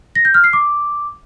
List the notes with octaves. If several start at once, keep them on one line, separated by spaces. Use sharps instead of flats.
A#6
G6
F6
C7
D6